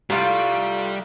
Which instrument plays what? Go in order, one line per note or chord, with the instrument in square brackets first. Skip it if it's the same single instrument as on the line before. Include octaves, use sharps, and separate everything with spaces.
[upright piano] C2 [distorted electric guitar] G3 [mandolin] A3 F4 F5